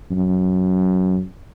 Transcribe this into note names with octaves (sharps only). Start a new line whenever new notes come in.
F#2